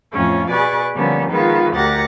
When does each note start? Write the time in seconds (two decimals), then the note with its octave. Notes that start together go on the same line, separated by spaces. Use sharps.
0.13 F2 A2 C#4 F4
0.51 B2 G#4 B4 D5 C#6 F#6
0.94 D3 F3 G3 A#3 B3 C#4
1.29 D#3 G#3 B3 F4 B4
1.75 D2 G4 A#4 F#5 A6 A#6